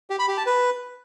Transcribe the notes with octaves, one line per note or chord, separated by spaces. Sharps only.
G4
B5
G4
A5
B4